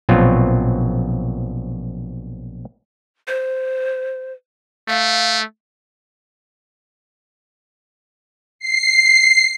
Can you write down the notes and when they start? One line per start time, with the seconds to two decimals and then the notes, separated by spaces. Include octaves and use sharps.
0.09 A#1 B2 F#3 C4 F4
3.28 C5
4.89 A3 F5
8.59 C7